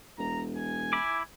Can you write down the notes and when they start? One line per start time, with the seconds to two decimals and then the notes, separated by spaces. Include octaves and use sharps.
0.18 E1 A#5
0.57 G#5
0.93 E4 B5 D6